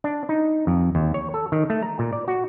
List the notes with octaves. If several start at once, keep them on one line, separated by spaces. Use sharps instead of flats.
D4
D#4
F2
D#2
C#5
A4
D#3
A3
A#5
A#2
D5
F#4